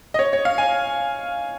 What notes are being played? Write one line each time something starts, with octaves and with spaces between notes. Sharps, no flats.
D#5
C#5
C#5
F5
G#5